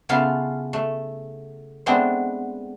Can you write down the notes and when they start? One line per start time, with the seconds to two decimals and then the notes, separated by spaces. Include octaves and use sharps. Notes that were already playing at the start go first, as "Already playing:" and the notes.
0.09 C#3 B3 E4 F4 A4 F5
0.73 A3
1.86 G#3 A3 B3 C4 D4